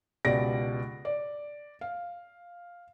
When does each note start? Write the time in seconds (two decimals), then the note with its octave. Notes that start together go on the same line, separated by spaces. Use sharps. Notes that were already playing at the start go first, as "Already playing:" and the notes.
0.25 C#2 B2 G4 D5 A#6 D7
1.05 D5
1.81 F5